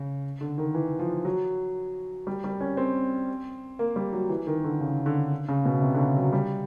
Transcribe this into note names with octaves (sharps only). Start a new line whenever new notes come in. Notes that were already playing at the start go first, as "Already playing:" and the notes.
Already playing: C#3
D3
D#3
E3
F3
F#3
G3
G3
C#4
C4
A#3
G3
F#3
E3
D#3
D3
C#3
D3
C#3
B2
C3
D3
C#3
F#3
G3